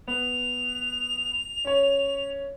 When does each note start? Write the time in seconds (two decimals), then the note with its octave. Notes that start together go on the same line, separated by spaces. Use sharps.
0.08 B3 F7
1.65 C#4 C#5